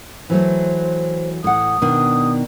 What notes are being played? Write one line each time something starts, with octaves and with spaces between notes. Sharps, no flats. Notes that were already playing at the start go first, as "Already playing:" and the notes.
E3 F#3 A3 C5
A2 F#5 D#6
B2 D#3 D4